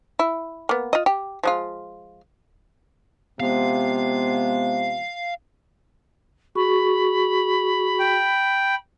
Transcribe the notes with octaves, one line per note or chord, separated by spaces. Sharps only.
E4
A#3 B3
F4 D#5
G4
F3 G#3 F4
C3 F3 G#3 B3 F5
F#4 G#4 B5 C#6
G5